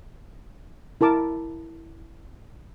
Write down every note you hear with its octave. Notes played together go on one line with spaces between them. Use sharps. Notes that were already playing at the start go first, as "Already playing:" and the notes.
E4 A#4 A5 D6